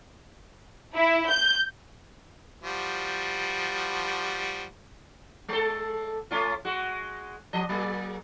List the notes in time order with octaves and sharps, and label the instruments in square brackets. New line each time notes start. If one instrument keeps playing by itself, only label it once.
[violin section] E4
G6
[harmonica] F3 G3 F#4
[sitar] G#3 A4
A3 C#4 F4
G#3 F#4
F3 D#5
F#3 A#3 G#4